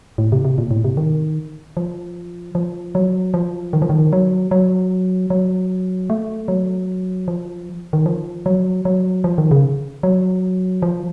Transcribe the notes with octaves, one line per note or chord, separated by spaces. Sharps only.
A2
C3
C3
A#2
A2
C3
D#3
F3
F3
F#3
F3
D#3
F3
D#3
F#3
F#3
F#3
A3
F#3
F3
D#3
F3
F#3
F#3
F3
D#3
C#3
F#3
F3